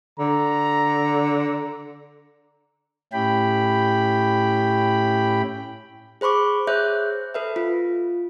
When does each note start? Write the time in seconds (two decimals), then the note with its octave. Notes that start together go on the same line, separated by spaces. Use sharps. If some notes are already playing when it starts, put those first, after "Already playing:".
0.20 D3 A#5
3.13 A2 C#4 E4 G4 G5 B5
6.21 G#4 C5 B5 C#6 D6
6.67 G#4 C5 C#5 E5 F#6 G6
7.34 A4 B4 E5
7.56 F4